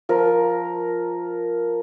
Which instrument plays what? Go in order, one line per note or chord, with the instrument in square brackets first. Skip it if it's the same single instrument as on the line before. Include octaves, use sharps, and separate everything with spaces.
[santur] F3 A#4